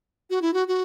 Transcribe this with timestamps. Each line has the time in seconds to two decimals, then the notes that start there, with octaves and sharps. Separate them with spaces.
0.30 F#4
0.42 E4
0.54 F#4
0.68 F#4